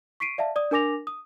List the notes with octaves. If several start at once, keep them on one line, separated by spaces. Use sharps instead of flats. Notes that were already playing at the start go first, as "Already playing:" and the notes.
C#6 B6 C7 D7 D#7
D5 E5 F5 A5
D5 D#6
D4 A#4 G#5 D6 A#6 F7
D#6